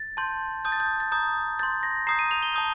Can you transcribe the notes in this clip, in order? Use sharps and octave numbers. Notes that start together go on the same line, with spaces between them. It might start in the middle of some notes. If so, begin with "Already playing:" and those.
Already playing: A6
A5 C6 G6
A5 D#6 G6
A6
G6
A6
A#5 D#6 G6
C6 G6 A6
A#6
A#5 D#6 G6 C7
D#7
F7
G7
A5 D#6 G6